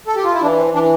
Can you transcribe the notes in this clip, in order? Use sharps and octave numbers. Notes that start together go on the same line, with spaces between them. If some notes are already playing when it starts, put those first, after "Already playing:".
A4
G4
F4
E4
E3 D4
C4
E3 D4